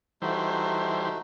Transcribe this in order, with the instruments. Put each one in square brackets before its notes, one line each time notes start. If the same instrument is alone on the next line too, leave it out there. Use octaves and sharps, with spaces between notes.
[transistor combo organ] E3 G3 C5 [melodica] A3 D#4 F#4